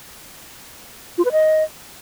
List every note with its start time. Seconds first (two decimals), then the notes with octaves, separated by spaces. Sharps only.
1.18 F4
1.25 B4
1.32 D#5